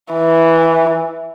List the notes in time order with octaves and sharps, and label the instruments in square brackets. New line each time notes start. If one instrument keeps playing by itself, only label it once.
[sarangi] E3